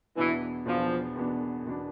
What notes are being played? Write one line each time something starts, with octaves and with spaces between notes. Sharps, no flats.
E2 B2 E3 B3 D4
E2 B2 F3 B3 D4
E2 B2 B3 D4
E2 B2 B3 D4